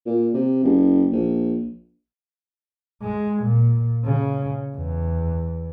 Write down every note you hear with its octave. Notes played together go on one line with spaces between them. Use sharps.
A#2
C3
F#1
A#1
G#3
A#2
C#3
E2